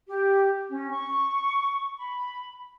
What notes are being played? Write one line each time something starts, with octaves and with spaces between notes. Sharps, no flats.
G4
C#4
C#6
B5